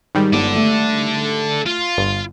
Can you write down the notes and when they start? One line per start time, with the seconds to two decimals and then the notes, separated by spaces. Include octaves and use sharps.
0.15 G#2 D#3 G3
0.33 G1 A4 D5
0.56 A3
1.66 F4
1.98 G1